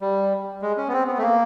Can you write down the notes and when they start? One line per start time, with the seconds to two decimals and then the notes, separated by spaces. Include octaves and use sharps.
0.01 G3
0.62 G#3
0.77 C#4
0.88 B3
0.93 C4
1.07 B3
1.18 A3
1.22 A#3